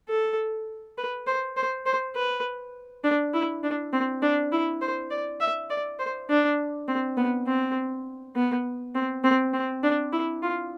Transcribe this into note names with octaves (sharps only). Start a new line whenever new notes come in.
A4
B4
C5
C5
C5
B4
D4
E4
D4
C4
D4
E4
C5
D5
E5
D5
C5
D4
C4
B3
C4
B3
C4
C4
C4
D4
E4
F4